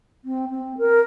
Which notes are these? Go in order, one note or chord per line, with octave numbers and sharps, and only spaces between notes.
C4
C4
A#4